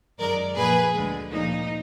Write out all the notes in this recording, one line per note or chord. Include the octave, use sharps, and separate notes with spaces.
F#2 D#3 G#3 A#4 D5
A#2 F3 A#3 G#4 B4
D2 D3 G#3
A#2 F3 A#3 D#4